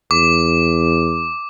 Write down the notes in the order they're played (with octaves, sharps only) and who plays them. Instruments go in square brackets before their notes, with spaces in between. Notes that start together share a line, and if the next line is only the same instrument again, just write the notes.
[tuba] E2 [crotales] D6